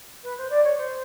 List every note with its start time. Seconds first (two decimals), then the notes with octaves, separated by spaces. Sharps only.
0.23 B4
0.37 C5
0.49 D5
0.63 C#5
0.77 C5